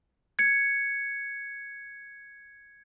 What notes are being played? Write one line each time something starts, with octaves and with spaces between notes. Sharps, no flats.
G#6 C#7